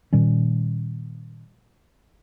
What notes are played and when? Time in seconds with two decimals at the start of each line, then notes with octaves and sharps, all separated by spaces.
0.13 A#2 D#3 G3 C#4